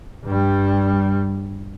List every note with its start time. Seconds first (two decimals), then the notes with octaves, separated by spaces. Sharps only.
0.25 G2 G3